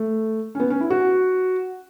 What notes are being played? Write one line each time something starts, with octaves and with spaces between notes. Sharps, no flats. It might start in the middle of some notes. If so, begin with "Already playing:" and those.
Already playing: A3
C#4
B3
C#4
E4
F#4